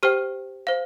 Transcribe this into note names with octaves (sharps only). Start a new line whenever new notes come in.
G4 C5 G5 F6
C5 F5